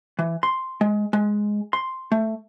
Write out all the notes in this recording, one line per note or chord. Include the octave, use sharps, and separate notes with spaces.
E3
C6
G#3
G#3
C6
A3